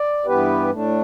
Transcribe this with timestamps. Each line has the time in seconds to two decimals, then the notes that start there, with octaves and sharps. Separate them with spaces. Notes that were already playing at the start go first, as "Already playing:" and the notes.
Already playing: D5
0.26 G2 E3 B3 G4 B4
0.71 A2 A3 D4